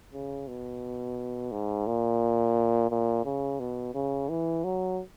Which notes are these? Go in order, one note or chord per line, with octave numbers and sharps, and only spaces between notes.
C#3
B2
G#2
A#2
A#2
C#3
B2
C#3
E3
F#3